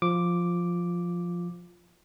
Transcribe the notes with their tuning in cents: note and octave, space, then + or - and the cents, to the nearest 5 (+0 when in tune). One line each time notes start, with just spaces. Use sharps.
F3 +0 F4 +0 D6 +0